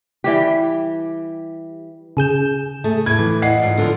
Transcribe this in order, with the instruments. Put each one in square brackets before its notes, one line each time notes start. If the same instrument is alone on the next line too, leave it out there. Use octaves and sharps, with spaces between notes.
[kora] E3 G3 G4
[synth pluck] C#3 G#4 G6 E7
[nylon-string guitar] A3 G#4
[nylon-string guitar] A2 [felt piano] G#6
[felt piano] E3
D#5 F#5 C7
[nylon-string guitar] G#2 F4 D5
D3 F3 B3